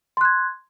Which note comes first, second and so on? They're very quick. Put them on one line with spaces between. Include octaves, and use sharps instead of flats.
C6 F#6 G#6